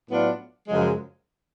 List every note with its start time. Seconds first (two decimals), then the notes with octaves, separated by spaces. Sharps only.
0.08 A2 F#3 B3 D4 F4
0.68 F#2 C#3 F3 G#3